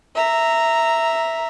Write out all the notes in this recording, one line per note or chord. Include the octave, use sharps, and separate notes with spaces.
E5 A#5